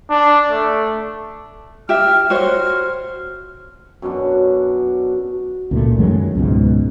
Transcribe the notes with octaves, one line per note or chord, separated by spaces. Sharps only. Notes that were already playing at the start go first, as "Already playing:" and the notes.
D4
A3
G4 E5 F6
F#4 C5 C#5 F6
F#2 B2 D4
C#2 A#2 A3
F#2 D#3 F#3 G#3
C#2 G#2 B2